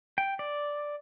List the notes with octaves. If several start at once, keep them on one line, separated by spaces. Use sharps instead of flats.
G5
D5